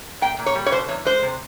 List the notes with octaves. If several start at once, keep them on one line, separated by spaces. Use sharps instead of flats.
A#2 G5
A#2
C#5
G3
C#5
B2 C5
E2 C#5
G#3 C5
C3